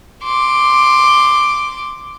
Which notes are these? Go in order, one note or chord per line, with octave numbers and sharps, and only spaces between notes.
C6 D6